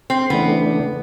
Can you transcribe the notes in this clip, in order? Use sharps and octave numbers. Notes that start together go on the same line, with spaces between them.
C4
C#3 E3 A3 B3 D4